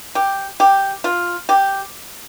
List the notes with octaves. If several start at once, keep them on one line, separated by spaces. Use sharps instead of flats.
G4
G4
F4
G4